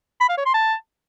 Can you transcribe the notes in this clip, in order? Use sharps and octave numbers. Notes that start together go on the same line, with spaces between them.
B5
F5
C#5
C6
A5